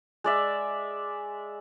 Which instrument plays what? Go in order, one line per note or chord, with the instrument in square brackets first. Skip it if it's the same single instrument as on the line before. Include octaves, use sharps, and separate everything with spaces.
[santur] G#3 D5 E5